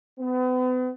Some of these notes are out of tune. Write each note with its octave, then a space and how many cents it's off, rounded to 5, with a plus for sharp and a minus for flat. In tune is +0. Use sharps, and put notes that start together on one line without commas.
B3 +40